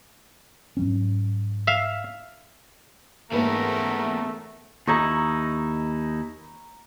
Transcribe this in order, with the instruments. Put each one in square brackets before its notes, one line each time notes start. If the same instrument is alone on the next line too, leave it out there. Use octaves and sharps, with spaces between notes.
[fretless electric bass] G#2 F#3 C#4
[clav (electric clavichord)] E5 F5
[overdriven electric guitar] E2 C#3 [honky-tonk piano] G#2 A#3 B4 [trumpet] A3 [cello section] A#4
[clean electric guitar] D#2 D#4 E4 [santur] A#5 C#6